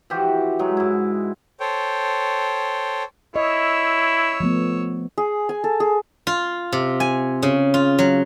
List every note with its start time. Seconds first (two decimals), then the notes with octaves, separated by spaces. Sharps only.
0.10 E3 F3 F#4 G4
0.59 F#3 G#3
0.77 G#2 E4
1.60 A4 C5 C#5 G5
3.36 E4 C#5 D#5 E6
4.40 F3 A3 B3
5.18 G#4
5.49 G#5
5.64 A4
5.80 G#4
6.27 F4
6.73 C3
7.00 G#5
7.43 C#3
7.74 F4
7.99 F#3